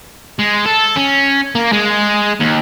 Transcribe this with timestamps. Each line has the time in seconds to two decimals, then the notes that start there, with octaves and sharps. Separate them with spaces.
0.39 G#3
0.65 A4
0.96 C#4
1.55 A#3
1.72 G#3
2.40 D#2